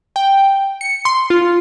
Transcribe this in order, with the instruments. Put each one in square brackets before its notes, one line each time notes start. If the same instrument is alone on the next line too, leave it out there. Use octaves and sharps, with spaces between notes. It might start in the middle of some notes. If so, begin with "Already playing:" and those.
[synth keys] G5
C#7
C6
F4